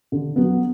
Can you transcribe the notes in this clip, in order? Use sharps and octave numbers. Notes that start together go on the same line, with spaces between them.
D3
F#3 B3